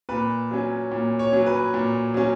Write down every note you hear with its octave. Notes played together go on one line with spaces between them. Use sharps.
A#2 B4
F#3 C#4
A#2
C#5
F#3 C#4
B4
A#2
F#3 C#4